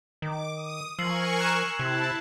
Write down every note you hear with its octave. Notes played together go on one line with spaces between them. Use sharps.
D#3 D6
D#6
F3 A#4 G#5 C#6 E6 C7 F#7
F#6 G#6 E7
C3 E4 A5